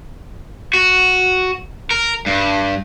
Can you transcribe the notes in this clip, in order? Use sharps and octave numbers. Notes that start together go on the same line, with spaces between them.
F#4
A#4
G2